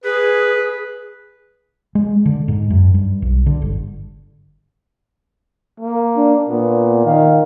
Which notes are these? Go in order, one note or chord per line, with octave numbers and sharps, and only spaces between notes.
G#4 B4
G#3
D3
G#2
F#2
G2
B1
D3
G1
A#3
D4
A#2 B3
D#3 F5